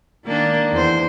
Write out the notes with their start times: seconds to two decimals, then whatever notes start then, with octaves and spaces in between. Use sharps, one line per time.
0.25 D#3 A#3 D4
0.71 E2 C5